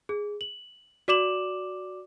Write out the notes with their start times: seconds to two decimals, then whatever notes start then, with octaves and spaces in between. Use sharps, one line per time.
0.09 G#4
0.41 F#7
1.08 F#4 D5 D6 E7 F#7